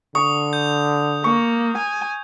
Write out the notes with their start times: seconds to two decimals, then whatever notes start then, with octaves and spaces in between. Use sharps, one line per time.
0.15 D3 C#6 D#6
0.53 G6
1.24 A#3 C#6
1.77 G#5